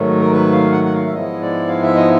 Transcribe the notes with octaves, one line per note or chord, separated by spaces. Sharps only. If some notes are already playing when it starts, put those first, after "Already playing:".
Already playing: G#2 D#3 F#3 A3
A#4
B4
F5
F#5
F#5
F5
E5
G#2 F3 G#3 B3 E4 D#5
D5
F5
E5
D#5